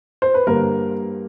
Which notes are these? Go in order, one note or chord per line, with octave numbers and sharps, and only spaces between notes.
C5
B4
G2 D3 G3 A#3 A#4